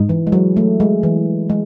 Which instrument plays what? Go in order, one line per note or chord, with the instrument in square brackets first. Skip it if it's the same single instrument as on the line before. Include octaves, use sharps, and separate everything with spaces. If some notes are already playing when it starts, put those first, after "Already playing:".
Already playing: [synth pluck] G#2 D#4
[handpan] E3
G#3
F#3
A3
G#3
E3
G#3